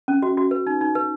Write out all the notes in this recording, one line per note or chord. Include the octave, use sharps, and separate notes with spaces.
C#4
F#4
F#4
B4
D#4
D#4
B4